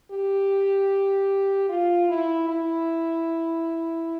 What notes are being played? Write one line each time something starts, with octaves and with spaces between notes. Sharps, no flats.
G4
F4
E4
E4